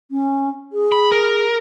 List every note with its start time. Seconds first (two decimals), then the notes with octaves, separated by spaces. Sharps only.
0.11 C#4
0.72 G#4
0.92 B5
1.12 A#4